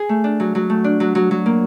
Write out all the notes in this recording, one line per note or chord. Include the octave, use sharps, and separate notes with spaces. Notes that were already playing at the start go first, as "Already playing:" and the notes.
Already playing: G#4
A3
D4
F#3
F#3
A3
D4
F#3
F#3
F#3
A#3